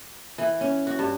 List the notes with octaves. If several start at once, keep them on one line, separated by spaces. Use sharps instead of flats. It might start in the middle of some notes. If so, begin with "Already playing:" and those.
E3
C#4
F#4
G2